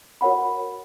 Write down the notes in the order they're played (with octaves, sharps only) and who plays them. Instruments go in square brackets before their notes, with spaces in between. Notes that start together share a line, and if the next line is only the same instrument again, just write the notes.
[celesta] F#4 A#4 C#5 F#5 B5